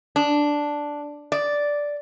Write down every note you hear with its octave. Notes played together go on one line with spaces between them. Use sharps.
D4
D5